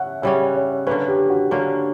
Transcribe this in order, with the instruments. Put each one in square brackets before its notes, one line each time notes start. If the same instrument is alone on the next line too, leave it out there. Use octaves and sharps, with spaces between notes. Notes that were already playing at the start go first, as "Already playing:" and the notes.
Already playing: [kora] C#4 [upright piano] E5 F#5
[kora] C#3 G3 C#4 [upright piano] E5
[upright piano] C#5
[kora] D3 A#3 C#4 [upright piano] B4
[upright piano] G4
F#4
[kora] D3 A#3 C#4 [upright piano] G4